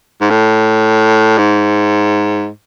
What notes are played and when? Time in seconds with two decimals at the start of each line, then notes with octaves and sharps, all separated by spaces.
0.21 G#2
0.30 A2
1.38 G#2